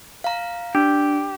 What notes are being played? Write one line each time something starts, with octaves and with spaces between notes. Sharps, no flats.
F5 A#5
D4 G4